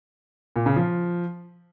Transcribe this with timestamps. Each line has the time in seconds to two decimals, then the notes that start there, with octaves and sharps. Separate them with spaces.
0.56 A#2
0.66 C#3
0.76 F3